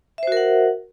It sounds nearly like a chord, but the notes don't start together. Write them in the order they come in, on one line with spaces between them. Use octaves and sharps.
E5 C5 F#4 A#4 F#5